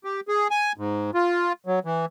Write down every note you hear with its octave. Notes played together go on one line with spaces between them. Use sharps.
G4
G#4
G#5
G#2
F4
F#3
E3